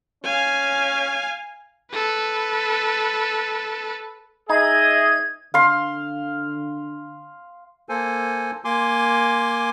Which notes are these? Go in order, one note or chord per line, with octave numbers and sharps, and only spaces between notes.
C#4 F5 G#5
A4 B4
D#4 G#4 D#5 E5 G#6
D3 F5 C6
A#3 A4 C5 G#5
A#3 G#5 C6 D6